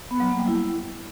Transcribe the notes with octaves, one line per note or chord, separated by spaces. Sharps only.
B3
F#3
A#3
G3
E4